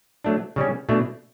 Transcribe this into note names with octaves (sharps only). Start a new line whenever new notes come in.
F#3 A3 D4
C#3 G3 C#4
B2 A3 D4